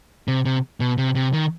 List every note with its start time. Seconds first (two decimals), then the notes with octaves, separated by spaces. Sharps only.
0.28 C3
0.45 C3
0.80 B2
0.98 C3
1.15 C3
1.33 D#3